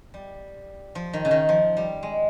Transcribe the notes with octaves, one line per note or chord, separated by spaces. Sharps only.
G3
F3
D#3
C#3
D#3
F3
G3
G#3